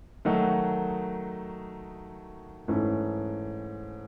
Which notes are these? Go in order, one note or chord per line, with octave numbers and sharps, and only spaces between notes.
D#3 F#3 A3 D#4 F#4
G#2 E3 A3 C#4